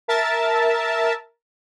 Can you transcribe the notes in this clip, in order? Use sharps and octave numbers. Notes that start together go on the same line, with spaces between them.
A#4 E5 A5 A6